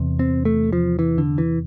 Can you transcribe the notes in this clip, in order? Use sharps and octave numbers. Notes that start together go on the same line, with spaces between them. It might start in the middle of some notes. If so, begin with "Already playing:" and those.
Already playing: E2 C3
C4
A3
F3
E3
D3
E3